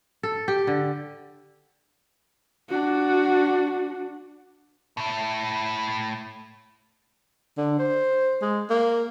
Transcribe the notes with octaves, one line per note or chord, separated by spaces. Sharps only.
A4
G4
D3
D4 F#4
A2 E4
D3
C5
G#3
A#3